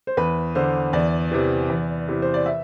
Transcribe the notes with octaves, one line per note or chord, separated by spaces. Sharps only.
C5
E2 B4
D3 C5
E2 D5
C3 E3
E2
C3 E3
C5
D5
E5